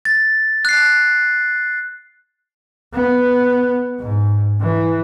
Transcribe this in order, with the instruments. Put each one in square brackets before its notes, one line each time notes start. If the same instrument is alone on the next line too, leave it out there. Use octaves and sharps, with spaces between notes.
[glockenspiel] A6
F#6 C7
[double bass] B3
G#2
E3